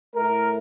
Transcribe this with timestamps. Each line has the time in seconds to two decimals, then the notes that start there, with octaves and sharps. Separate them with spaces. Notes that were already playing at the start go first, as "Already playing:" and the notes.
0.15 A2 A3 A#4